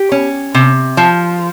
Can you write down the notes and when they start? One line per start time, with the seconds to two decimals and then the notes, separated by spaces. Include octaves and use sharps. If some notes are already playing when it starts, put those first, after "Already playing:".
Already playing: G4
0.12 C#4
0.54 C3
0.97 F3